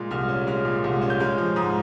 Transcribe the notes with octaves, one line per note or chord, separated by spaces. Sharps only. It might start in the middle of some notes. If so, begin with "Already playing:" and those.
Already playing: A#2 G#3
C2 F6
C#4
G#3 F6
A#2
C2
C#4
G6
G#3 F6
F3
G#2 D#6